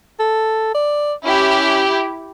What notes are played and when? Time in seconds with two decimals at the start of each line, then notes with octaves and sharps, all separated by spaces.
0.20 A4
0.75 D5
1.24 C#4 E4 G4